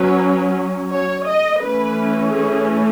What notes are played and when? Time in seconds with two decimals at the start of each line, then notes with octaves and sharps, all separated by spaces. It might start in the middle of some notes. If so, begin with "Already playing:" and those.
Already playing: F#3 C#4 B4
0.92 C#5
1.27 D#5
1.61 E3 A3 C#4 B4
2.31 G#4